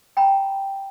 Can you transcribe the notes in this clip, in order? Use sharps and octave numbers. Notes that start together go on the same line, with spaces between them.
G5 A#5 B5